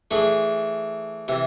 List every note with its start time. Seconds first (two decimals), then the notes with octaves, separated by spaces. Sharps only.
0.11 E3 A3 D4 G#4
1.28 C3 E3